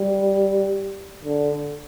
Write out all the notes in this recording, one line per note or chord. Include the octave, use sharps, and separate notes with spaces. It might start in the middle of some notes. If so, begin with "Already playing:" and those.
Already playing: G3
D3